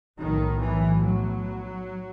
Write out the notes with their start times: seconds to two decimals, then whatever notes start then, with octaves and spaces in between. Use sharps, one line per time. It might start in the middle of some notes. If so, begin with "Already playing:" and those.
0.18 B1 A2 D#3
0.61 E3
1.03 F#3